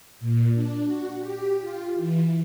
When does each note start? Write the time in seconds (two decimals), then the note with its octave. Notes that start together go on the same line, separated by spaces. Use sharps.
0.20 A#2
0.54 D4
0.85 F#4
1.19 G4
1.60 F4
1.96 E3